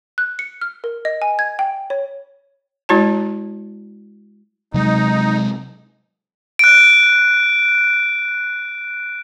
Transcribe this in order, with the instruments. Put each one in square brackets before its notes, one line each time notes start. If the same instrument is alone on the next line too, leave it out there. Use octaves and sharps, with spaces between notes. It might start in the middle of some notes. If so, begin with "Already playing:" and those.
[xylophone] F#6
C#7
F6
A#4
D#5
G#5
G#6
G5
C#5
[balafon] G#3 E4 F#4 C#5 A5
[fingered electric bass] C3 F#3 G#3 [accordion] D#4
[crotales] F#6 D7